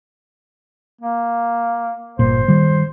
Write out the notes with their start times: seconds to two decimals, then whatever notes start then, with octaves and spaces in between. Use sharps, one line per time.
1.01 A#3
2.19 G1 A#2 C5
2.48 D#3 G3